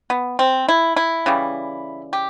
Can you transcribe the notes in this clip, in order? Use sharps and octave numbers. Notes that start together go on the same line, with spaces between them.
B3
C4
E4
E4
C#3 E3 G3
G4